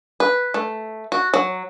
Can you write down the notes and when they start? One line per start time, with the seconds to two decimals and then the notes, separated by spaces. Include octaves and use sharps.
0.20 B4
0.54 A3
1.12 F#4
1.34 F#3